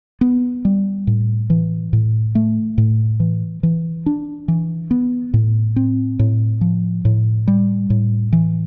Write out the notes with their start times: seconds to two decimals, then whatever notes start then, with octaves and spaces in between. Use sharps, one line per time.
0.21 B3
0.65 G3
1.07 A2
1.50 E3
1.93 A2
2.35 A3
2.78 A2
3.20 E3
3.63 E3
4.06 D4
4.48 E3
4.91 B3
5.34 A2
5.76 C4
6.19 A2
6.61 F3
7.05 A2
7.48 G3
7.90 A2
8.33 E3